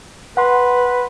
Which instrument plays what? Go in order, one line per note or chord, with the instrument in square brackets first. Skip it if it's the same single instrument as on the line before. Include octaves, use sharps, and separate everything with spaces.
[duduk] B4 [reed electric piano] F#5 C6